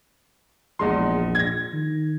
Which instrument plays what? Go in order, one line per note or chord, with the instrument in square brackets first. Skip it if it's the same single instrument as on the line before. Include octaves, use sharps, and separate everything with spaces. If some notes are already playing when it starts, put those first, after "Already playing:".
[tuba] A#1 [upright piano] E2 G#3 C6
[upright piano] G#6 A#6
[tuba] D#3